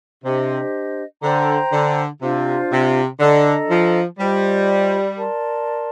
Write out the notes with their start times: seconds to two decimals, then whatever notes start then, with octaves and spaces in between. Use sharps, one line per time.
0.24 C3 D4 G4 C5 D#5
1.22 D3 C5 G5 A#5
1.72 D3
2.22 C3 D4 F4 C5 F5
2.71 C3
3.20 D3 D4 A4 D#5 A#5
3.69 F3
4.19 G3 F4 C5 D#5
5.17 A#4 D5 A5 C6